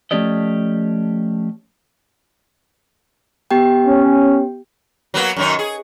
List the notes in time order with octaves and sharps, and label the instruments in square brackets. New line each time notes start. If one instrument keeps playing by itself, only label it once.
[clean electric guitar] F3 A3 C#4 G4 D5 D#5
[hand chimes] B3 G4 G5
[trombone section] C#4
[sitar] F#3 A#3 B3
F#2 D#3 C#4
G#4